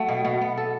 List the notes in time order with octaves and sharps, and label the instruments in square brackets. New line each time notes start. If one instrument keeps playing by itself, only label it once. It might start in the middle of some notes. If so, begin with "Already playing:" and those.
Already playing: [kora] F#3 A3 [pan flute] F#5
[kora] B2
B2
B3
A4